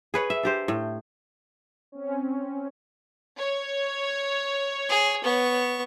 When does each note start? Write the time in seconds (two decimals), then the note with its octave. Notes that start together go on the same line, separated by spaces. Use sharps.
0.14 G#4 B4 C#5
0.30 E5
0.43 D4 G4 C5
0.68 A2
1.92 C4 C#4
3.38 C#5
4.89 G#4
5.24 B3 C#6